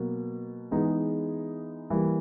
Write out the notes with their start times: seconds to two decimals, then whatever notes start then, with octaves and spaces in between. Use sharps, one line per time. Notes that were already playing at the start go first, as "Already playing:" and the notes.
Already playing: B2 F#3 A#3
0.71 E3 G#3 B3 D#4 G#4
1.90 E3 G3 A#3